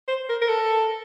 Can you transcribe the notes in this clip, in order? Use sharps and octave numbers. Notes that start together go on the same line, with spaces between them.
C5
A#4
A#4
A4